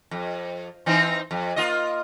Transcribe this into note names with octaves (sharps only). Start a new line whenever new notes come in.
F2
E3 C4 D#4
F2
A#3 F4 D#5